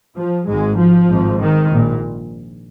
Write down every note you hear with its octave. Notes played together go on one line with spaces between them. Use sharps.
F3
G#1 G#2 G#3
F3
G#1
G#2
D#3
A#1 A#2